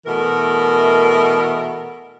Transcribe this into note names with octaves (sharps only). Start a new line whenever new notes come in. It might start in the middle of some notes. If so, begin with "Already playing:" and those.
B2 E3 A3 A#4